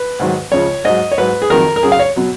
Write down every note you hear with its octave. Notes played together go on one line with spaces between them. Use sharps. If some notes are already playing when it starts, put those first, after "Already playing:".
Already playing: B4
G#2 D#3 F#3
C#2 C#3 F3 C#5
G#2 F#3 D#5
C#5
G#2 F#3 B4
G#4
F2 D#3 F#3 A#4
A#4
F#2 C#3 F#3 G#4
F5
C#5
B2 F#3